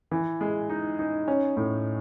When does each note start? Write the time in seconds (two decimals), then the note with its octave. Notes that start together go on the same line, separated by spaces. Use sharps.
0.11 E3
0.41 G#3
0.70 D#4
0.99 D#4
1.28 C#4
1.57 A2